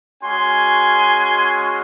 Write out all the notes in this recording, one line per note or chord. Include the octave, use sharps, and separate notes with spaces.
G#3 C#4 F#4 G#5 C6